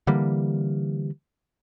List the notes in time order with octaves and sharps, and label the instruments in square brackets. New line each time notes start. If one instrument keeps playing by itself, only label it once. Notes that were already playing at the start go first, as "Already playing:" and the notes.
[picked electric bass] D3 E3 G3 A#3